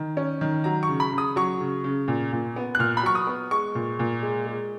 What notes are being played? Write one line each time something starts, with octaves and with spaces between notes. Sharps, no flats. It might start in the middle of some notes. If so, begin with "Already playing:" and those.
Already playing: D#3
C#4
D#3
F#3 A#5
C#6
C#3
B5
C#3
D#6
F#3 C#6
C#3
C#3
A#2
A#2
B3
F#6
A#2 F6
B5
F#3 C#6
D#6
B3
G#3 C#6
A#2
A#2
G#3
G#3